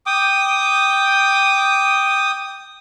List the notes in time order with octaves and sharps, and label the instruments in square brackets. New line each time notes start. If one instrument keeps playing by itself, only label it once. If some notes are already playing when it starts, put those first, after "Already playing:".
[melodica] G5 D6 [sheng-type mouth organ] D#6